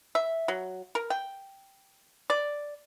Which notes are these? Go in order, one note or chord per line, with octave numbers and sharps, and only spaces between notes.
E5
F#3
A#4
G5
D5